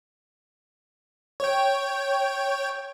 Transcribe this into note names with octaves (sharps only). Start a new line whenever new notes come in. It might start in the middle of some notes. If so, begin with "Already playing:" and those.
C#5 G5